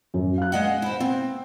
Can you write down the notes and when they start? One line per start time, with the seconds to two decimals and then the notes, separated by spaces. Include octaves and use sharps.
0.14 F#2
0.38 F5 F#6
0.52 G#3 D#5 F#5
0.82 E4 C5
1.00 C4